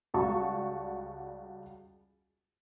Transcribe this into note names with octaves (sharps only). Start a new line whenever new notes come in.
C#2 G3 F#4 A5 C#6